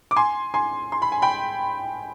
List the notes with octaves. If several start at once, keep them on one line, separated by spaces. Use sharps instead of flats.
D6
G#5 C6
G#5 C6
C6
B5
G#5
G5 B5